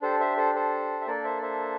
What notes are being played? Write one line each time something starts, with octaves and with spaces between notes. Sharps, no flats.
D4 G4 A4 C5
C5 E5
A4 C5
A4 C5
E5
A#3 D4 A4 A#4 D5
C5 E5
D5
C5 E5